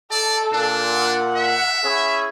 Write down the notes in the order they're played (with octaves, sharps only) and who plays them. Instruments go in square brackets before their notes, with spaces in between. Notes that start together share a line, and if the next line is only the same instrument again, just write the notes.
[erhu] A4 [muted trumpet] D5
[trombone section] A#2 [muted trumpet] D4
[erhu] F#5
[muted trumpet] E5
[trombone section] C#4 E4 G#4